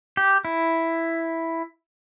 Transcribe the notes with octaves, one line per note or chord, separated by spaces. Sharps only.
G4
E4